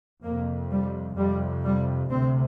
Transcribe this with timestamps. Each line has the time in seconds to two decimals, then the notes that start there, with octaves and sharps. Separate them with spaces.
0.24 F2 C3 A#3
0.71 G3
1.17 F2 C3 G3
1.64 G3
2.10 D2 C3 C4